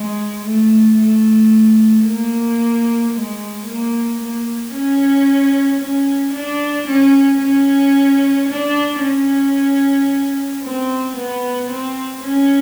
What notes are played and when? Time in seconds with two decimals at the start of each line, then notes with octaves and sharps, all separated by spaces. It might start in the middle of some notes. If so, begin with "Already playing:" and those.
Already playing: G#3
0.44 A3
0.98 A3
2.05 A#3
3.13 G#3
3.66 A#3
4.20 A#3
4.73 C#4
5.80 C#4
6.34 D4
6.88 C#4
7.42 C#4
8.48 D4
9.02 C#4
10.63 C4
11.16 B3
11.70 C4
12.24 C#4